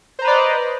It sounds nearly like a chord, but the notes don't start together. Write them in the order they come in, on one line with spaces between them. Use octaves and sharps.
C5 A#5 B4 D5 D#5